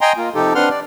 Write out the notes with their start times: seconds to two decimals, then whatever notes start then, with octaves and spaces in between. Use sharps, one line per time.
0.01 D#5 G5 G#5 A#5 C6
0.17 A#3 F4
0.35 C3 F3 D#4 G4 A4
0.55 C4 D4 B4 F#5 C6 F6
0.70 D5